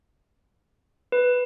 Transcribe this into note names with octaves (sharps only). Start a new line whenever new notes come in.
B4